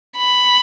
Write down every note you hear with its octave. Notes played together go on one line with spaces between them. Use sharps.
B5